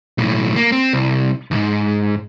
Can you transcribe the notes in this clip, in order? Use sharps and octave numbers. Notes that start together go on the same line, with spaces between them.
B1 A2
A#3
C4
C2
D#2 G#2